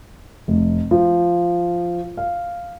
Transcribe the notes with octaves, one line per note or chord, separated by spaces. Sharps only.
F1
F3
F5